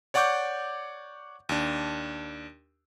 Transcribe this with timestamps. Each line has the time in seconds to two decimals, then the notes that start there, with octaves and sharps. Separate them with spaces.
0.14 C#5 D5 F#5 C#6 D6 G6
1.49 D#2 D4